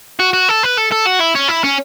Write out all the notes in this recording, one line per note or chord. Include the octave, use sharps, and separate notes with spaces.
F#4
F#4
A4
B4
A4
A4
F#4
E4
C#4
E4
C#4